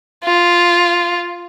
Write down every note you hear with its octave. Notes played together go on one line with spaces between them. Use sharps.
F4